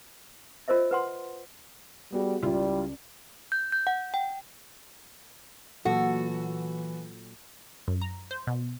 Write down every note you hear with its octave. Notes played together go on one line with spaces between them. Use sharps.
F4 A#4 C5 D#5 E5
B4 F#5 C6
G3 B3 F#4 G#4
C#2 G3 E4 F4 D5
G6
G6
F#5
G5
A#2 E3 F#3 F#4 A4
F#2
A#5
C5
B2